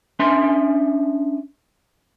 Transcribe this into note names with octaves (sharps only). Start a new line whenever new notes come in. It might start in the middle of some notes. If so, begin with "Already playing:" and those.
C#4 D4 E5 G#5 C6